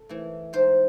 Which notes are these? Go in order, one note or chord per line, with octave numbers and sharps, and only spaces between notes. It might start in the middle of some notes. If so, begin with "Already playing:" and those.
Already playing: A4
E3 A3
G#2 C5